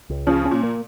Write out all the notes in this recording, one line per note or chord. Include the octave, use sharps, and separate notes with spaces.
C#2
C#3 F3 C#4
C#4
A#2
A#3